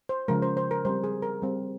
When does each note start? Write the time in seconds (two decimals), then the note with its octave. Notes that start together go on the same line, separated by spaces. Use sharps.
0.09 C5
0.28 C#3 F3 G#3 A#4
0.42 C5
0.57 C5
0.71 A#4
0.85 G3 C4 C5
1.04 G#4
1.22 A#4
1.42 G3 C4